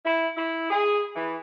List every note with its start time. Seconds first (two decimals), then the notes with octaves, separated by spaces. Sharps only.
0.05 E4
0.37 E4
0.71 G#4
1.16 E3